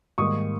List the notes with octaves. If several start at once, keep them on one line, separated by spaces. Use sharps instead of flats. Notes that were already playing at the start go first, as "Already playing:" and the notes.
G#2 D#3 G3 A#3 C#6 D#6